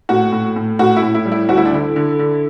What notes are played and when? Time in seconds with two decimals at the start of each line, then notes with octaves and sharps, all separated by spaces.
0.09 A2 F#4
0.32 A2
0.56 A2
0.79 A2 F#4
0.96 E4
1.03 A2
1.15 E4
1.26 G3
1.32 E4
1.49 D2 F#4
1.57 E4
1.65 D4
1.72 D3 E4
1.96 D3
2.19 D3